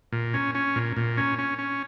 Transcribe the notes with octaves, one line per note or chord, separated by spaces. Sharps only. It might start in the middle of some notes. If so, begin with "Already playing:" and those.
A#2
C#4
C#4
A#2
A#2
C#4
C#4
C#4